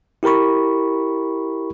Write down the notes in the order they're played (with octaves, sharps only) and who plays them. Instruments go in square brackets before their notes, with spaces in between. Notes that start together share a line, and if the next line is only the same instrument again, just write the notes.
[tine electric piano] E4 G4 A#4 B5 C#6